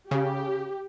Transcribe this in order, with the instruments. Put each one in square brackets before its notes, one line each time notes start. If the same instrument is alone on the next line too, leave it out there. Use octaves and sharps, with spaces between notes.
[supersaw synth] C#3 [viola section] G4